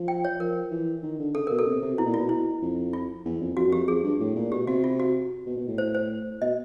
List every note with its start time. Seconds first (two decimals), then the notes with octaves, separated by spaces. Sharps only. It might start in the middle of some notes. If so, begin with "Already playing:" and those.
Already playing: F3
0.08 G5
0.25 C#5
0.40 F3 A#4
0.71 E3
1.03 D#3
1.19 D3
1.35 C#3 A4
1.47 B2 A#4
1.59 A4
1.67 C3
1.82 C3
1.94 B2 E4
2.06 A#2
2.14 B2 F4
2.29 E4
2.62 F2
2.93 F4
3.25 E2
3.41 F2
3.57 F2 F#4
3.67 F#2
3.72 F2 G4
3.88 F2 G#4
4.03 G2
4.20 A2
4.36 A#2
4.51 B2 G4
4.67 C3 F#4
4.84 F4
5.00 F#4
5.46 B2
5.57 B2
5.68 A2
5.78 C5
5.95 C5
6.42 B2 D#5